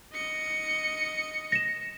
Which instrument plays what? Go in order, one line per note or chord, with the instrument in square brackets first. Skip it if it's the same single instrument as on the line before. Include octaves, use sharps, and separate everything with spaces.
[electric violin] D#5 C#7
[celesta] A#6 E7